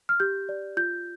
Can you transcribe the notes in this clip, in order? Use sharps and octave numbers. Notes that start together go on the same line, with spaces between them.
F6
G4 G6
D5
F4 G6